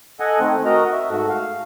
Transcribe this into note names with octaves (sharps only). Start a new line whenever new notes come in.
A4 D#5 F#5 G#5
D#3 A3 C4
F#4 A#4 D#5 A#5
E5
G#2 A3 F#4
F5